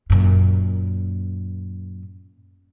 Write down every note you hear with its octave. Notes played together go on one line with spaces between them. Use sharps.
F#2 A#2